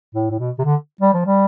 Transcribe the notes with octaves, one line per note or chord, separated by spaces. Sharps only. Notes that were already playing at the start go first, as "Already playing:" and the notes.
A2
A2
B2
C3
D3
G3
F3
G3